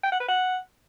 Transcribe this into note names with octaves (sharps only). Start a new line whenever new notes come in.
G5
F#5
B4
F#5